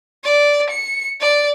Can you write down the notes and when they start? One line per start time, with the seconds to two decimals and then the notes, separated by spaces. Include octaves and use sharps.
0.24 D5
0.70 C#7
1.20 D5